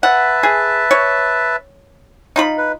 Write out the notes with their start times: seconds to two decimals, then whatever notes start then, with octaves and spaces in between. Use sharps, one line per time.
0.03 B4 E5 F#5 A5
0.43 G#4
0.91 C#5
2.36 D#4 F4 B5
2.58 B4